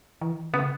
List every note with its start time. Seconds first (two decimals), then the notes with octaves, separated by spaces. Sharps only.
0.21 E3
0.53 C#3 B3